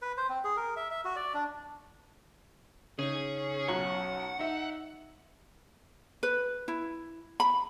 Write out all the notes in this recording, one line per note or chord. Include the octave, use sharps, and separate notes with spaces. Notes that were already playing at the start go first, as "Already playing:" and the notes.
B4
C5
C4
G#4
A#4
E5
E5
F#4
D5
D4
C#3 C#4 D#4 G#4
B1 C#5 F#5 A#5
D#4 E5
B4
E4
B5